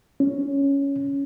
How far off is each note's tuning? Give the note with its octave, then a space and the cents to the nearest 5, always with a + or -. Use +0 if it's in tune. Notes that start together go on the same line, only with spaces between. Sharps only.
C#4 +5